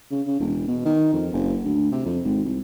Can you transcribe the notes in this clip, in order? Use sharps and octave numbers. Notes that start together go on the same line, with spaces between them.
C#3
C#3
E1
B2
D#3
F2
F#1
D2
C3
F2
G#1
C2